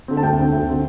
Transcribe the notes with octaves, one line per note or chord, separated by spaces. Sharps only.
D3 C4
A5
D2 G5
D3 C4
D2
D3 C4